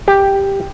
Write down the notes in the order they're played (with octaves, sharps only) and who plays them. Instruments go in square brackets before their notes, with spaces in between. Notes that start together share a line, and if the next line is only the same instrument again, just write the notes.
[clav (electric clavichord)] G4